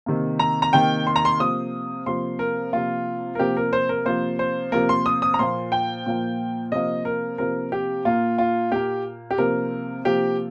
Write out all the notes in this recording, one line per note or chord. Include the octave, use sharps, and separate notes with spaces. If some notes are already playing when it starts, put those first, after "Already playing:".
C3 D#3 A#3
A#5
A#5
C3 D#3 A#3 G5
C6
A#5
C6
C3 F3 A#3 D#6
C3 F3 A#3 C6
A#4
C3 F3 A#3 F4
A#4
C3 F3 A#3 G4
A#4
C5
A#4
C3 F3 A#3 C5
C5
C3 F3 A#3 A#4
C6
D#6
D#6
A#5
A#2 F3 A#3 C6
G5
A#2 F3 A#3
C3 F3 A#3 D#5
A#4
C3 F3 A#3 A#4
G4
A#2 A#3 F4
F4
A#2 A#3 G4
G4
C3 F3 A#3 A#4
C3 F3 A#3 G4